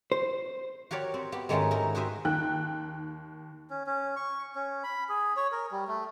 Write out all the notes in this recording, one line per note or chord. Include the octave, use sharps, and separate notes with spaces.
C5
F#4 G4 A#4 C#5 D5
C4
B3 F#4 G4
G#2 D#3 G#3 A3 C#4 D#4
D#4 E4 A#4
F#4 G4 C5 D#5 E5
D#2 D#3 G5 F#6
C#4
C#4
C#6
C#4
B5
G#4
C#5
A#4
G3
A3